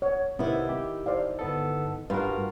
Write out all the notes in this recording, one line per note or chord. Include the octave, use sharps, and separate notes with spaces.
C#5 F#5
C2 C3 D#3 B3 E4
G4
C5 D5 F5
G1 B3 A4
G2 F4 F#4 A#4 B4